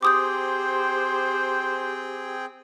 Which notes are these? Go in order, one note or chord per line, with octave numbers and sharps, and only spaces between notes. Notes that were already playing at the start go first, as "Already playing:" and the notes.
C4 G4 G#4 C5 G5 D6 D#6 G6